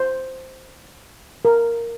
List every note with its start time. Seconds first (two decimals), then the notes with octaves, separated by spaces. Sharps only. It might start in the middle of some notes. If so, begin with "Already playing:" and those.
Already playing: C5
1.45 A#4